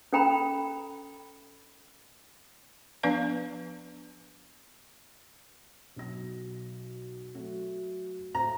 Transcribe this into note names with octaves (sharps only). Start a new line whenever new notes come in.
C#4 A4 G5 A#5 B5
F3 B3 D4 B4 D5 F5
B1 F#3 A#6
F#3 A3 F#4
A2 A3 C5 A#5